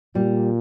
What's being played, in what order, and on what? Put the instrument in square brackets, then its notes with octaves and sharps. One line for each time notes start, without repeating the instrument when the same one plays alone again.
[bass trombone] A#2 [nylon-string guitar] G3